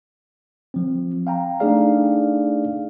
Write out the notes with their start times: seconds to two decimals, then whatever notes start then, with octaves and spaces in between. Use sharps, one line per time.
0.74 F3 C4
1.27 F5 G5 A#5
1.60 A3 D4 D#4 G#4 D5 F5